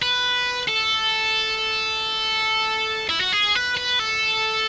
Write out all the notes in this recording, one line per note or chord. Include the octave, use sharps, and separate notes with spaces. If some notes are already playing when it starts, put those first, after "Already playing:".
B4
A4
E4
F#4
G#4
B4
B4
A4